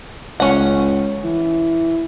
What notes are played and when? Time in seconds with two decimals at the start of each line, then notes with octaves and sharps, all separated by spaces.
0.40 C#2 C#4 F#5
1.24 E3